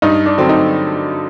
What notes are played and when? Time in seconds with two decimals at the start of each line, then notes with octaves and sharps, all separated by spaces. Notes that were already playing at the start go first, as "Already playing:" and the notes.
0.02 G2 D#4
0.26 D4
0.38 D3 F#3 C4
0.49 D#4